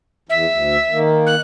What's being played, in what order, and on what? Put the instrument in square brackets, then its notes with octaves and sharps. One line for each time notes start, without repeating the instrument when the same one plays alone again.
[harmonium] E2 [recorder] E5
[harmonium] D2
D#3 A#3
[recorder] F#6